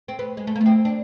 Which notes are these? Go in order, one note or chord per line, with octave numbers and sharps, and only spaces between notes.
C4
B3
G#3
A3
A#3
B3
C4
D4